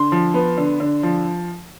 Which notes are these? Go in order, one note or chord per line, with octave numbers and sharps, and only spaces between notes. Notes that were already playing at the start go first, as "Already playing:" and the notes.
Already playing: D3 C6
F3
B3
D3
D3
F3